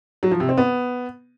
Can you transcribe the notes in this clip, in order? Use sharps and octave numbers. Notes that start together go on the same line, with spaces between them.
F#3
F3
C3
C4
B3